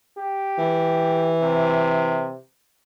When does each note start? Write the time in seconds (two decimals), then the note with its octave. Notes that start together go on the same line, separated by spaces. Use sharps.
0.17 G4
0.58 E3
1.41 C3